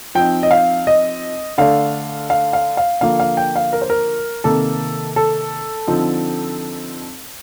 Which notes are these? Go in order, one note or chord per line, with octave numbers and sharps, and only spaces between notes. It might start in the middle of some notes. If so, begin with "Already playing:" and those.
F3 C4 D#4 G5
D#5
F5
D#5
D3 A3 D4 F5
F5
F5
F5
D3 F3 A#3 F5
F5
G5
F5
A#4
C5
A#4
C3 D#3 A#3 A4
A4
D3 F3 C4 D#4